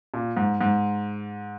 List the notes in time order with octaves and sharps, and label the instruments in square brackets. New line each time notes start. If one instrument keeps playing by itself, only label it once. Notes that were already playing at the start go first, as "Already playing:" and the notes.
[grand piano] A#2
G#2
G#2